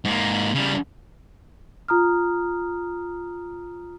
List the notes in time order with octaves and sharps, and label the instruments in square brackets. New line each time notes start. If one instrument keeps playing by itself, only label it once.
[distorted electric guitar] G#2 A#3
C#3 G3
[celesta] F4 A#5 D#6 F6